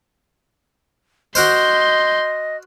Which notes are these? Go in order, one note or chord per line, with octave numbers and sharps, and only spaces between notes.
F#4 A#4 C5 D#5 C6 G6